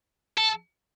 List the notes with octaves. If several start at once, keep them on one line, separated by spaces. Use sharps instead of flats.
A4